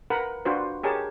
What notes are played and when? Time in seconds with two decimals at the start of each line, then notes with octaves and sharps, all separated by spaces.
0.10 A#4 B4 F#5 B5
0.45 D4 F4 F#4 B4 C5
0.83 G4 G#4 A#4 C#5 A5